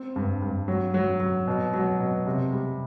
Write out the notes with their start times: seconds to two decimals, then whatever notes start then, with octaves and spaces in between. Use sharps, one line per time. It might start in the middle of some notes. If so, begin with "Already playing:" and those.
Already playing: C4
0.16 G2
0.42 G2
0.68 F#3
0.94 F#3
1.20 F#3
1.47 B2
1.74 F#3
2.00 B2
2.27 C3
2.52 G3